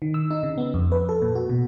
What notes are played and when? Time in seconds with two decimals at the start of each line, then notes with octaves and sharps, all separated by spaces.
0.02 D#3
0.14 E6
0.31 D#4
0.43 C#3
0.58 B3
0.74 F2
0.92 B4
1.09 A4
1.22 A#2
1.35 F#4
1.50 B2